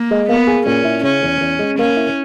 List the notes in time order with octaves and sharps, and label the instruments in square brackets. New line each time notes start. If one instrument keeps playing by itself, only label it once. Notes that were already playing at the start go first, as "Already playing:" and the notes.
Already playing: [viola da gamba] A#3
[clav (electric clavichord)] G#3
[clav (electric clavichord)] A#3 [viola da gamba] B3
[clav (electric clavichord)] G#4
[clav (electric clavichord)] A#2 [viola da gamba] C#4
[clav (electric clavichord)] E4
[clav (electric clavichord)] C#3 [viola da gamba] C#4
[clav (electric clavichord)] E2
E2
G#3
[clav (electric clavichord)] A#3 [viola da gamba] C#4
[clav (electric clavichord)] E4